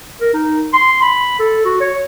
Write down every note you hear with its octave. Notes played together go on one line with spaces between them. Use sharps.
A#4
D#4
C6
B5
A4
F#4
C#5